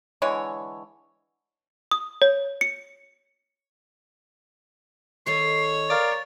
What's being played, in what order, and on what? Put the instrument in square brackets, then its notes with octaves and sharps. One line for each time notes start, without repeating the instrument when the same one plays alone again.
[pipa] D3 E3 G#3 C#5
[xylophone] D#6
C#5
C#7
[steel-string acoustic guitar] D#3 A4 D#5 [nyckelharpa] C#5 [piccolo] C7
[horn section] A#4 D5 F5 [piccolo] A6